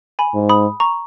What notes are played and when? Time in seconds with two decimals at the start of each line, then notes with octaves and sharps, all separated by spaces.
0.19 G#5 B5
0.35 G#2
0.49 B5 D#6
0.80 A#5 C#6